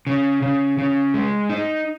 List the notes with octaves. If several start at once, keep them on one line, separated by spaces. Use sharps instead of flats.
C#3
C#3
C#3
G#3
D#4